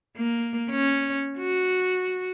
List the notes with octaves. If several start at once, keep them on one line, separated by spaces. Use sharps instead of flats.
A#3
C#4
F#4